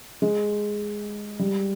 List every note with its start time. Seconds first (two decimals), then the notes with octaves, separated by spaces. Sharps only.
0.22 G#3
1.39 G3